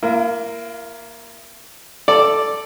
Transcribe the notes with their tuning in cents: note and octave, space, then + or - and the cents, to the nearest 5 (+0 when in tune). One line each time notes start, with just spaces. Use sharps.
A#3 +0 E4 +40
A4 +0 D5 +0